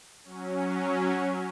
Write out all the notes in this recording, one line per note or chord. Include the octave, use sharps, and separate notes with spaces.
F#3 C#4